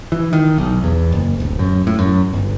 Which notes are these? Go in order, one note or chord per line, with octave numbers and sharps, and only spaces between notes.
E3
D#3
B1
E2
F#1
D1
F#2
A2
F#2
G1